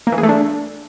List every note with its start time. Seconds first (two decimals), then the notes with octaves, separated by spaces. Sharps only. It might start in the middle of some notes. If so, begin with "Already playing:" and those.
0.07 A#3
0.12 E3
0.18 G#4
0.23 A3
0.29 D4